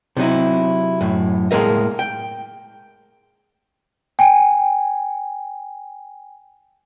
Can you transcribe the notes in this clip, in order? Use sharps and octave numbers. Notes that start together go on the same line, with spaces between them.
C3 F#3 D#4 E4
F#2 A2
A2 G#3 A#3 A#4 D#5
G5
G5 G#5